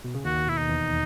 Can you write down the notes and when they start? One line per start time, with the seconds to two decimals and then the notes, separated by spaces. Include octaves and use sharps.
0.04 B2
0.14 C#3
0.24 D#2 D#3 F#4
0.47 B2 E4
0.58 D#4
0.69 E2 E3